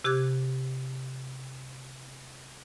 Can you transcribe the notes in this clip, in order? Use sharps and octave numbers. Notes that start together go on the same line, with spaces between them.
C3 G4 D6 F#6 G#6